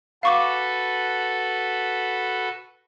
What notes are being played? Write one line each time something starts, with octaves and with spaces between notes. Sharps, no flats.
F#4 A4 B4 F5 C#6 D6